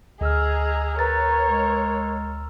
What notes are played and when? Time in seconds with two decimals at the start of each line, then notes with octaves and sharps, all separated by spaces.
0.21 D2 G#4 D#5 A#5 E6 F6
0.99 A#4 B4 C#5 A#5 A6
1.47 G#3